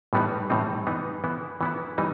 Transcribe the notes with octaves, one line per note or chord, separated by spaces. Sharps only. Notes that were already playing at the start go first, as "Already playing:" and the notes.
A2 E3 G3 B3 D#4
A2 E3 G3 C4 D#4
E3 B3 D#4
E3 B3 E4
E3 B3 E4
E3 G3 D#4